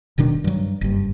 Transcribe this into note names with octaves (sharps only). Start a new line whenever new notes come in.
D#1 B2 D#3 D4
G2 F#3
F#1 G2